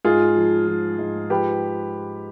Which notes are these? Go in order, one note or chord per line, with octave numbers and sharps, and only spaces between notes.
G#2 F4 G#4
F3
F3
G#2
F3 G4 B4